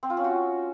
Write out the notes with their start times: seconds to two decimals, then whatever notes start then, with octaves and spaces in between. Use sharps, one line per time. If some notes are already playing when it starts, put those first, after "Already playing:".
0.03 C4
0.10 F4
0.17 C#4
0.24 F#4